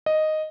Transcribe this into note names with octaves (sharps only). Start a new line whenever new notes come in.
D#5